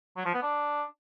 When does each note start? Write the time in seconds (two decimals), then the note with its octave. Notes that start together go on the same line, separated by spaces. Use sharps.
0.17 F#3
0.25 F3
0.34 B3
0.43 D4